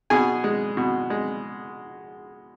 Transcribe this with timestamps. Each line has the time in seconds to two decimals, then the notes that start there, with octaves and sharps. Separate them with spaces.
0.10 B2 G#4 G#5
0.44 G#3
0.77 B2
1.10 G#3